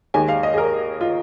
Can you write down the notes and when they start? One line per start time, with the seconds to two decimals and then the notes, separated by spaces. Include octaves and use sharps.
0.14 D#2 D#3 G#3 G#5
0.28 F5
0.43 D#5
0.54 G#4
0.58 A#4
1.01 F4